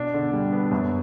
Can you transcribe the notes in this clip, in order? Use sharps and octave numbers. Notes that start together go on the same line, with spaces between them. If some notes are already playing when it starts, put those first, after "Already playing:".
Already playing: B2 D4
D3
G3
B3
F#2